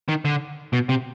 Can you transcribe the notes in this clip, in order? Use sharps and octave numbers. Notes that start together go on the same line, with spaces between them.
D#3
D3
B2
C3